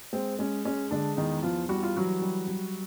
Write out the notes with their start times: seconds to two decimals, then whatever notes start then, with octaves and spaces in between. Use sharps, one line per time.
0.13 G#3 C4
0.39 G#3 C#4
0.65 G#3 C#4
0.91 D3 G#3 D4
1.17 E2 D#3 D#4
1.43 E2 F3 F4
1.69 G3 F#4
1.83 F4
1.95 E3 F#3 F#4
2.21 G3
2.47 G3